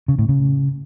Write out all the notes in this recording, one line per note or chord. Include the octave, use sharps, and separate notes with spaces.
C#3
A2
C#3